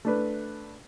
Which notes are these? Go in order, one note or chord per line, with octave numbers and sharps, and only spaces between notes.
A3 D4 B4